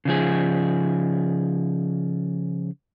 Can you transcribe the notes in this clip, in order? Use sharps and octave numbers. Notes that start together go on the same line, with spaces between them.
C#3 F3 G#4